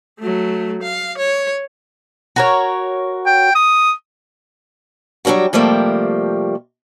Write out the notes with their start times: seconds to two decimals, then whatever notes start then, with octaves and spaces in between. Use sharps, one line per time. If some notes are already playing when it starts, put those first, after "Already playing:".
0.19 F#3 A3
0.82 F5
1.18 C#5
2.36 F#4 A#4 C#5
3.26 G5
3.55 D#6
5.25 F#3 G3 C#4 D4 F#4
5.53 C3 F3 G3 A3 A#3